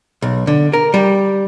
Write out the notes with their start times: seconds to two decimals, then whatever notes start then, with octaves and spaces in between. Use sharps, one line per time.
0.22 B1
0.47 D3
0.73 A#4
0.94 G3